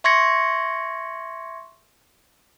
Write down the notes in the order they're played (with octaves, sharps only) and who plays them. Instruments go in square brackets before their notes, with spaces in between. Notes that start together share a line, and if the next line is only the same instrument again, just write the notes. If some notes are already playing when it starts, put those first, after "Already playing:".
[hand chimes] E5 C6 C#6 G#6 A#6 C#7